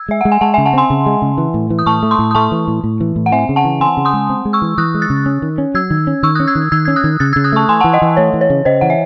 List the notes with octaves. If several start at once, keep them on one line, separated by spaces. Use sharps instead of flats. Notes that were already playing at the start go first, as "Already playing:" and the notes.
Already playing: E6 G#6
G#3 E5
G#3 F#5
G#5
G#3 F#5 A5
E5 G#5
C#3
F#5 A5
C4 G#5 C6
C#3
G#3
C#3
E3
A2
E3
D#6
A2 A5 C#6
A3
C6 D#6
A2
D#6
A3 A5 C#6
E3
A2
A2
E3
A2
F#5
C4 E5 G#5
C#3
F#5 A5
E3
C4 G#5 C6
C#3
C6 D#6
G#3
C4
G#3
C#6 E6
E3
E3 D#6 F#6
G#3
F#6 A6
C#3
C#4
D#3
C#4
F#3 E6 G#6
D#3
C#4
D#3 C#6 E6
D#6 F#6
C#4
E6 G#6
D#3
D#3 E6 G#6
C#4 G#6
D#6 F#6
D#3
C#3 F#6 A6
E6 G#6
C#3
D#6 F#6
A3 A5 C#6
E3 G#5 C6
F#5 A5
E3
D#5 F#5
E3
A3 C#5
E3
C#5
C#3
C#3 C5 D#5
E3 F#5
E5